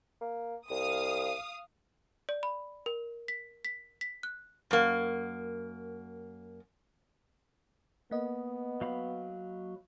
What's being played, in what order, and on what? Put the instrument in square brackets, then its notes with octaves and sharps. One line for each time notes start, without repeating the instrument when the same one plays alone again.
[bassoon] A#3
[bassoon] C2 [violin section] F5 D#6
[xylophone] D5
B5
A#4
B6
B6
B6
F#6
[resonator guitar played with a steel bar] F#2 A#3
[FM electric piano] A#3 D#5 [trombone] B3
[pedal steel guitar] F#3 F5 B5